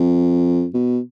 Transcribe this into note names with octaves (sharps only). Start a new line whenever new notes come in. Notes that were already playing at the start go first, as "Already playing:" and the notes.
Already playing: F2
B2